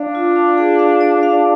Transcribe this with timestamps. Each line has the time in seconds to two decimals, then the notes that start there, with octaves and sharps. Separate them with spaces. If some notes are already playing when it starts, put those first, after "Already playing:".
Already playing: D4 F5
0.15 F4
0.36 F5
0.58 G#4
0.79 F5
1.01 D5
1.23 F5